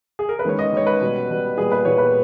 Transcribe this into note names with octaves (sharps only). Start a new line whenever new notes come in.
G#4
A#4
B4
D#3 G#3 C#4 C#5
D#5
D#3 G#3 C#4 C#5
B4
B2 G3 B3
B2 G3 B3
A#2 G3 B3 G#4
B4
A#2 G3 B3 C#5
B4